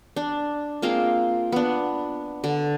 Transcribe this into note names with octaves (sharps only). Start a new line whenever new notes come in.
D4
G#3 A#3 C4 F4
B3 D4
D3